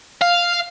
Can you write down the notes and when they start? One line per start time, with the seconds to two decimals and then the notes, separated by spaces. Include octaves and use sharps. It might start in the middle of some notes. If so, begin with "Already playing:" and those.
0.21 F5